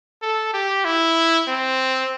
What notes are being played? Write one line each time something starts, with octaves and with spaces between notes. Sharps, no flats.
A4
G4
E4
C4